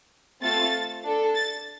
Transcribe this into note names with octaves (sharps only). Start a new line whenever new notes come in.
A3 C4 F4 A4 A6
D4 A4
A6